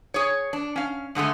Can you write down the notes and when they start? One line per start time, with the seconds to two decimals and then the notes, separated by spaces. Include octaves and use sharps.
0.14 G#4 C#5
0.53 D4
0.76 C#4 F5
1.15 G2 D3 G#3 A3